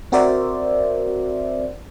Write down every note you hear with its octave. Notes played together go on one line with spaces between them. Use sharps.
C4 F#4 A#4 C5 D5 E5